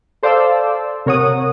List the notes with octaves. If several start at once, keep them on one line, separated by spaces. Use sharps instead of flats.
A4 C5 D5 F5 A5 E6
C3 A#4 C#5 F#5 D#6